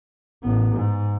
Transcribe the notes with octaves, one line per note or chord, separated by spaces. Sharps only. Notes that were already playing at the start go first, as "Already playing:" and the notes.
A1 B3
G#2